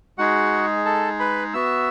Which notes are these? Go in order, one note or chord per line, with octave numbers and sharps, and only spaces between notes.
G#3 D#4 F#4 G#4 F#5
A4 A5
B4 B5
B3 F#4 E5 E6